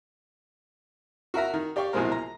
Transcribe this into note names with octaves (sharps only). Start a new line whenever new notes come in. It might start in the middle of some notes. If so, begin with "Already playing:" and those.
F#4 A#4 E5 A#5
D#3
G4 D5 F5 G5 C#6
A#1 B2 E3 G#3 C4 A#4
A#5